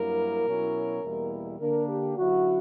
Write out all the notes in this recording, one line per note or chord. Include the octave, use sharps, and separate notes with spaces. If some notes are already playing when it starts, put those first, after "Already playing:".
Already playing: G2 F#3 A#3 E4 A#4
B2 F#3 C#4 E4
E2 B2 G3 A#3 E4
D3 A#3 D4 A#4
G4
D3 F#3 C#4 E4 F#4